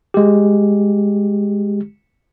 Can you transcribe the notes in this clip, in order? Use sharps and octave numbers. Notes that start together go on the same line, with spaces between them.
G#3 G4